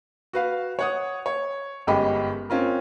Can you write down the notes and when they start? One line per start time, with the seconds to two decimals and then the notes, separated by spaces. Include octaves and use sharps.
0.33 F#4 B4 F5
0.79 C#5 F#5 D#6
1.26 C#5
1.87 G1 F#2 G#3 G4 D#5 B5
2.50 C4 C#4 F4 A#4